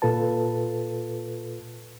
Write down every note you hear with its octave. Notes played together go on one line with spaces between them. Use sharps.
A#2 F4 A4 B4 A5